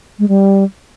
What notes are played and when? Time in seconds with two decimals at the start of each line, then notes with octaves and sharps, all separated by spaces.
0.19 G#3
0.28 G3